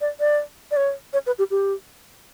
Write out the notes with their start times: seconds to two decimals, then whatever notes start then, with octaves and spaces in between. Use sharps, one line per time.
0.01 D5
0.20 D5
0.71 D5
0.77 C#5
1.13 C#5
1.27 B4
1.39 G4
1.51 G4